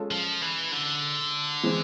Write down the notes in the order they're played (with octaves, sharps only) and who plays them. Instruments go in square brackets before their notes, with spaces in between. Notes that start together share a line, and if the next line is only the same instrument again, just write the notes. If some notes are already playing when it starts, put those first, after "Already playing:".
Already playing: [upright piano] G#3 C#4 F4 A4
[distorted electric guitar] F3
E3
D3
[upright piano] E3 G#3 C4